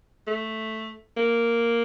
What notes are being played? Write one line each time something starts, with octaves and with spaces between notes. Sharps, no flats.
A3
A#3